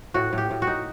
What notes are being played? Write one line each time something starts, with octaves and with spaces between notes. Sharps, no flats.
A2 F#4
A2
G4
A2
F#4
D#4